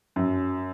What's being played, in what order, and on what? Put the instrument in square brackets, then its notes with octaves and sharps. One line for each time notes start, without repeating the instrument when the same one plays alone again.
[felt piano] F#2